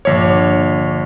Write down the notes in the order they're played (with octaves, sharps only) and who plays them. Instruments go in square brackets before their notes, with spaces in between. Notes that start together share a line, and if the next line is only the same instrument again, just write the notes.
[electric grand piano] A#1 C#5 [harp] G2 D3 D6